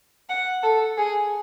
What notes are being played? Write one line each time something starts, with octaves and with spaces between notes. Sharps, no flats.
F#5
A4
G#4